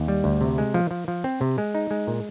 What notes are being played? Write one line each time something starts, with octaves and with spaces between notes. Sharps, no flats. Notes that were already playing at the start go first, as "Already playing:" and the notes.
Already playing: D#2
G3
D2
C3
G#3
F3
F3
F3
C4
C3
G#3
D#4
G#3
A#2